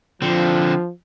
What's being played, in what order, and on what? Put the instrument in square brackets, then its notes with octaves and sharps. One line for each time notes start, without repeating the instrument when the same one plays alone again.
[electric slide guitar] D3 C4 [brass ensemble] F3